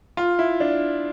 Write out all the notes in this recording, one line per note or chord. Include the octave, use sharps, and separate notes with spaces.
F4
E4
D4